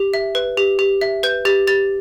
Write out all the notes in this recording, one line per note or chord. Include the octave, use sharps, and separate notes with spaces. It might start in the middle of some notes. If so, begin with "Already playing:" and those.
Already playing: G4
E5
B4
G4
G4
E5
B4 G6
G4 A6
G4 A6